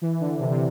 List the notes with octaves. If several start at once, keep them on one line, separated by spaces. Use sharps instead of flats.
E3
D3
C3
C3